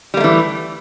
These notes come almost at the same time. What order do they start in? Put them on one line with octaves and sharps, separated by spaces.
G3 A#3 A3 E3